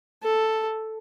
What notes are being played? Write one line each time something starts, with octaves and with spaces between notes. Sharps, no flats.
A4